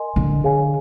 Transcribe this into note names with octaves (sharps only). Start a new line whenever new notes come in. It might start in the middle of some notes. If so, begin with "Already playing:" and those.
Already playing: A#4 D#5 G#5 C6
D3
G#4 C#5 F5 G#5